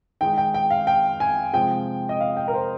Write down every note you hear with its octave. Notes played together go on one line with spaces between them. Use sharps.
D#3 G#3 D#4 G5
G5
G5
F5
G5
G#5
C3 F3 G#3 G5
D#5
F5
G5
A#4
C5